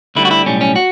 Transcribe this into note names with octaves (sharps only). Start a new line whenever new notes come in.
D2 D3 G3 E4
F#4
E4
B1 A2 G3 C#4
C#4
F#4